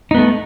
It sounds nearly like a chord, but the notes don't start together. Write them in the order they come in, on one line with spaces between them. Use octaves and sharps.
D#4 B3 A3